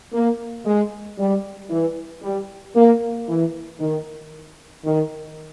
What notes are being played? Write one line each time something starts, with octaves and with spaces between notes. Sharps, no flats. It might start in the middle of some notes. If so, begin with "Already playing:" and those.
A#3
G#3
G3
E3
G3
A#3
E3
D#3
D#3